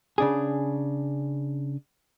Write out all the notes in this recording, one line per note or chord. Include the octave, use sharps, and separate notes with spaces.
C#3 D4 G#4